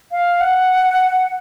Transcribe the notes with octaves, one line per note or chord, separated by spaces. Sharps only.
F5
F#5